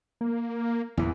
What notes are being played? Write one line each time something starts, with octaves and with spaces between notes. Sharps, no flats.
A#3
E2 A#2 E3